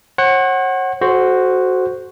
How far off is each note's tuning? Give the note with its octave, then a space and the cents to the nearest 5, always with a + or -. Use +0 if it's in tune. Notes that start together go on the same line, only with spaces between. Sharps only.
C#5 -45 F#5 +10
F#4 +0 A4 -40 C5 +0